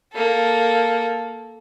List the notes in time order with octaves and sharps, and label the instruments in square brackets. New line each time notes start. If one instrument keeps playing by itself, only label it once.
[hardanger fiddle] A#3 A4